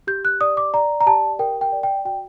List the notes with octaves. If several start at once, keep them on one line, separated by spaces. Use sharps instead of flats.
G4 G6
F#6
D5 D#6
D6
D5 A#5
A#5
G4 A5
A#4 G5
G5
D5
G5
F#4 G5